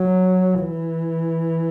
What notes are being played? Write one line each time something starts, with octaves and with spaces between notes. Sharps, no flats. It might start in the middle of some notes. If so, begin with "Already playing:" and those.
Already playing: F#3
E3